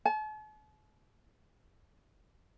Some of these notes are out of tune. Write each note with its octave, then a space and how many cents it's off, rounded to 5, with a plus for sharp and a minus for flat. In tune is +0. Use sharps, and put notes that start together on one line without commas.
A5 -45